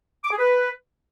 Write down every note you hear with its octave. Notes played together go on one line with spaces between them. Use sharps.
D6
G#4
B4